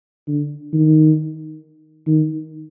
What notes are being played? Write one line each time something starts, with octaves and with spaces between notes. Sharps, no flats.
D3
D#3
D#3